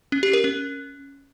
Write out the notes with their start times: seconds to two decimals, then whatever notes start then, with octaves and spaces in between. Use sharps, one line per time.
0.12 C#4
0.23 G4
0.33 A#4
0.44 C#4